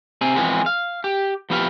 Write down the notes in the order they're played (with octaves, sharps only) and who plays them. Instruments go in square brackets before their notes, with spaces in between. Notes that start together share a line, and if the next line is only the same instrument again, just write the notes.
[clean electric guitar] C3 C4 G#4
E3 F3 G#3 B3 C4
F5
G4
F3 B3 E4 G4 B4 F5